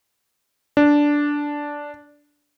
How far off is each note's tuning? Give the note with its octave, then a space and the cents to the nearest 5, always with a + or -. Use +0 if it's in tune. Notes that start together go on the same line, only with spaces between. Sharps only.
D4 -5